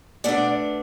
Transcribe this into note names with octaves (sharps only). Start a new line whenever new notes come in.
B2 A3 D4 D5 F#5